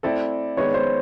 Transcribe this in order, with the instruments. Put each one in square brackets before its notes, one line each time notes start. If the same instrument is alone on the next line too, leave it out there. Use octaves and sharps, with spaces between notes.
[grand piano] A3 C4 E4 A4 [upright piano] D5
[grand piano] D#3 G#3 B3 D#4 [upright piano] C#5
[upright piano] C5